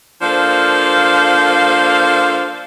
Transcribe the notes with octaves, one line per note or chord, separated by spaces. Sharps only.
F3 A#3 D4 A4 C5 F5